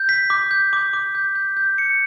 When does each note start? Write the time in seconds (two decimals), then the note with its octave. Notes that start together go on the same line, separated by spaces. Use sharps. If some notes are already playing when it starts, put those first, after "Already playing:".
Already playing: G6
0.09 B6
0.30 D6
0.51 G6
0.73 D6
0.93 D6
1.15 G6
1.35 G6
1.57 G6
1.78 C#7